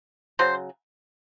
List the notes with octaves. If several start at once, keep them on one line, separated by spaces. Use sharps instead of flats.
C#3 F#3 C5